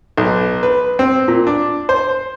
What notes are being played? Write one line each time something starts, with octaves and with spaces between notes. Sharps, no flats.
B1
B4
C4
A#2
D4
C5